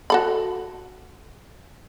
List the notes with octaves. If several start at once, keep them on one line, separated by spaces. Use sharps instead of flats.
F#4 A4 B5